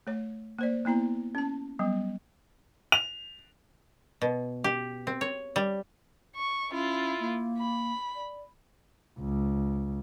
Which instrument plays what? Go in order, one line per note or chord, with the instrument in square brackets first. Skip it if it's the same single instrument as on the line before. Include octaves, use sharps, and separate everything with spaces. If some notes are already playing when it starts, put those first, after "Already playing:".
[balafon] A3 C#5
A#3 C5 D5
A#3 B3 E4 A#5
C#4 A5
F#3 G3 B3
[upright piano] F7
[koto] B2
G4
C4
C#5
G3
[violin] C#6
[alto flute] C#4 [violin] E4 F4
[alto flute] A#3
[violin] B5
[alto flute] D5
[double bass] C#2